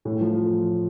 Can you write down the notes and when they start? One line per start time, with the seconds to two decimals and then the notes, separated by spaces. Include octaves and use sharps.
0.05 A2
0.21 F3
0.36 A2